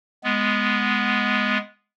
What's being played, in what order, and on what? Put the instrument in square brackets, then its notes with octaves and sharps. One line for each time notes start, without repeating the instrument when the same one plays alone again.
[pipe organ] G#3 B3